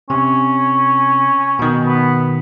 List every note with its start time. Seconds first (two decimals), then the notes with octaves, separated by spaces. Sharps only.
0.10 C3 C#4
1.59 B2 D#3
1.85 B3